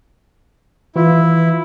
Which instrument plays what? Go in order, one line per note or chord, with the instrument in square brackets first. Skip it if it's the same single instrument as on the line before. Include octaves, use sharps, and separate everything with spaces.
[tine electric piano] E3 F4 [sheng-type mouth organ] E4